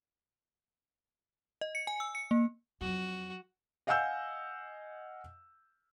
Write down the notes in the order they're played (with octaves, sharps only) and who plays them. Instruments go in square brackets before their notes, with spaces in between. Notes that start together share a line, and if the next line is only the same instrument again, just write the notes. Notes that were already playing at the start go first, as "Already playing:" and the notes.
[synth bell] D#5
C#7
G#5
E6
C#7
A#3
[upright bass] F2 F#3 [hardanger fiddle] F#4
[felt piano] D#5 F5 F#5 G#5 E6 G6